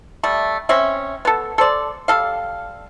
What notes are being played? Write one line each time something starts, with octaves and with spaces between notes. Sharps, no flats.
G3 A3
C4 C#4 E5
B3 A4
A4 C5 D5
G3 A4 F5